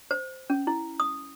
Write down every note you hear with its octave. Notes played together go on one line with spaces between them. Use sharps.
C5
C#4
E4
D#6